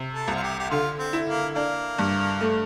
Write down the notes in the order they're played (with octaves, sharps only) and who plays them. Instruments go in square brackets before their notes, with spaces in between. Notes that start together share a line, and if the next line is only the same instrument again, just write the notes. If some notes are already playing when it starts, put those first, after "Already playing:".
Already playing: [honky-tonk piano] C3
[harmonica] A4
[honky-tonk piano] C2
[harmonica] F4
G4
G4
[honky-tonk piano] D3 [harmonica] F4
[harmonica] C4
[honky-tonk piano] E4
[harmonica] A#3
[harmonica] A#3 [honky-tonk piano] D4
[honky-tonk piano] G2
A3